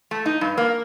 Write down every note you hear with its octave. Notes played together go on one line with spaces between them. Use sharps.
A3
D#4
G2
A#3